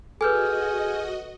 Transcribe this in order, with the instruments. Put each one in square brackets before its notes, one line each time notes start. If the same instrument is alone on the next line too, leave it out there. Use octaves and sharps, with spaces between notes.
[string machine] F#4 D#5 [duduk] G#4 [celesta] A4 B4 [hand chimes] G#5 F6 G6